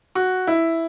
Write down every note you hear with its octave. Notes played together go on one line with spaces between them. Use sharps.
F#4
E4